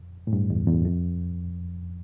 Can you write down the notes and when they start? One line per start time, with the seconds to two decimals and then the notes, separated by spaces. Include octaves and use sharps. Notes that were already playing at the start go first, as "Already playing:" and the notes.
Already playing: F2
0.27 A2
0.33 G2
0.50 E2
0.67 E2
0.85 F2